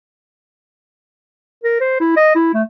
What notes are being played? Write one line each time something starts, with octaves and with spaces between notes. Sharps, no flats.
A#4
C5
E4
D#5
E4
A3